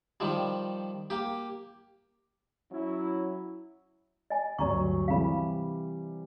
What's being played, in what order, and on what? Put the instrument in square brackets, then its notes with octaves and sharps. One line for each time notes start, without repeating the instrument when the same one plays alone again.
[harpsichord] D#3 F3 G3
A#3 G4
[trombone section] F#3 C#4 E4
[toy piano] D#5 G#5
[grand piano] D2 G2 F#3 [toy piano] D5 A#5 C#6
[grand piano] C3 E3 G3 [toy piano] F5 B5